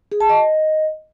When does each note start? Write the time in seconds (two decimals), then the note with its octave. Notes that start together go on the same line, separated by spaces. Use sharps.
0.12 G#4
0.20 A5
0.29 D#5